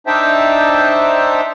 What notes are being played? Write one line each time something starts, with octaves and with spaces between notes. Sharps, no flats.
D4 D#4 C5 E5 G5 A5